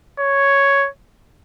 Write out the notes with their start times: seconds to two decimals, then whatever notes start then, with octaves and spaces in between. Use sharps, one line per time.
0.19 C#5